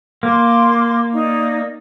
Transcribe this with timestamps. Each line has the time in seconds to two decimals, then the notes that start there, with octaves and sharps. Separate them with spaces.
0.23 A#3 C6 D6
1.14 D#4 D5